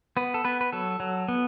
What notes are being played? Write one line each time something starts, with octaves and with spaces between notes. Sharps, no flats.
B3 B4
A4
B3 B4
B4
F#3 A4
F#3
B3